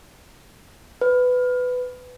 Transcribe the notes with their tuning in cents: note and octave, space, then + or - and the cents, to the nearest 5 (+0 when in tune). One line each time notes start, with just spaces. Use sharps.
B4 +15